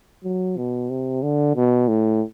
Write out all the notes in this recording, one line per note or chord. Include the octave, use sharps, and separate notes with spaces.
F#3
B2
C3
D3
B2
A2